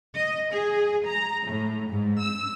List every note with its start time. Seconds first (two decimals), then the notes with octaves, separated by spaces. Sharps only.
0.15 D#5
0.52 G#4
1.05 A#5
1.46 A2
1.90 G#2
2.21 E6